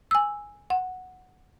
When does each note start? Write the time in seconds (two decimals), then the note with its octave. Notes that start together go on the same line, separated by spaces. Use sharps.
0.11 G#5 E6
0.70 F#5